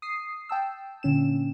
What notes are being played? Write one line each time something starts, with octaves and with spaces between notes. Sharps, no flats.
D#6 C7
G5 A5 E6
A#2 D3 C#4 E7